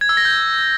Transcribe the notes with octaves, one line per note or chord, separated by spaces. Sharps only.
G#6
E6
A#6
G6